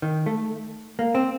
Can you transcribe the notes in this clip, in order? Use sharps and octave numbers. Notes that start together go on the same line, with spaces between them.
D#3
A3
A#3
C4